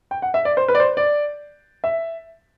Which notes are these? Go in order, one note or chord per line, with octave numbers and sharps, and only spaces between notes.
G5
F#5
E5
D5
C5
B4
D5
C5
D5
E5